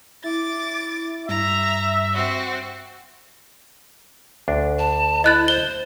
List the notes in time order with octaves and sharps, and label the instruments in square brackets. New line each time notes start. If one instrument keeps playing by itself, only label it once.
[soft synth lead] E4 [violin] D6 A6
[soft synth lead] G2 [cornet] E5 [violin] A#5
[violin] C4 F#4
[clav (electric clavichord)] D2 D4
[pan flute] A5
[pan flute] E4 [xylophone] D#5 F#6 A6
[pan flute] C5 [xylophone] G7